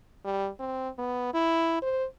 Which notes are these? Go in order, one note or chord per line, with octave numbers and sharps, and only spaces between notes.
G3
C4
B3
E4
C5